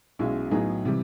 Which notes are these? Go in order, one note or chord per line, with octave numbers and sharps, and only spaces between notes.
B1 B2 G#3 C#4 E4
A2 F#3 B3 D#4 G#4
C3 E3 G3